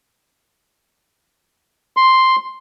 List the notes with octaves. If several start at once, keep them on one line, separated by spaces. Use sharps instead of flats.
C6